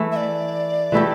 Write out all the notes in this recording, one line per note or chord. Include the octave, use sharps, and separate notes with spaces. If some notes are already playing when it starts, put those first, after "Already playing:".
Already playing: E3 A3 E4
E5
D5
E3 A3 E4 G4